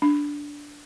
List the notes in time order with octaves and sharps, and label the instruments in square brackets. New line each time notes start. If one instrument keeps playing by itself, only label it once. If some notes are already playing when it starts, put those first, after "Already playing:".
[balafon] D4